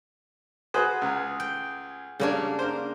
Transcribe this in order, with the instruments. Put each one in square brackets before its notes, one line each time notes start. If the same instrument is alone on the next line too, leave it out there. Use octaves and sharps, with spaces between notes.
[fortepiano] F#4 B4 C5 [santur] G#4 F#5
[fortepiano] C#2 A#5
[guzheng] G5
[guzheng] C#3 A#3 D4 [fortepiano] G3 C#5
[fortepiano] A#4 C5